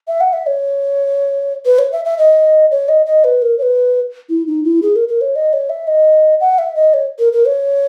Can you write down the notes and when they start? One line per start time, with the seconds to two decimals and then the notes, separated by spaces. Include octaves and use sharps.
0.08 E5
0.21 F#5
0.33 E5
0.47 C#5
1.65 B4
1.79 C#5
1.92 E5
2.05 E5
2.18 D#5
2.71 C#5
2.89 D#5
3.06 D#5
3.24 B4
3.42 A#4
3.58 C#5
3.63 B4
4.29 E4
4.47 D#4
4.64 E4
4.82 G#4
4.96 A#4
5.08 A#4
5.21 C#5
5.36 D#5
5.53 C#5
5.70 E5
5.87 D#5
6.40 F#5
6.58 E5
6.76 D#5
6.94 C#5
7.19 A#4
7.33 A#4
7.47 C#5